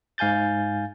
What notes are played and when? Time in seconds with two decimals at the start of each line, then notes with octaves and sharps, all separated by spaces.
0.18 G#2 F5 G#5 G6 A6